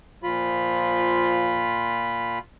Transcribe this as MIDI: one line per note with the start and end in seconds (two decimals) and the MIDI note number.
0.23 2.39 46
0.23 1.76 53
0.23 2.39 65
0.23 2.39 83